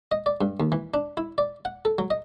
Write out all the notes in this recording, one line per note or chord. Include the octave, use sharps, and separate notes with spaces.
D#5
D5
G2
D#2
E3
D4
E4
D5
F#5
A4
F#3
D#5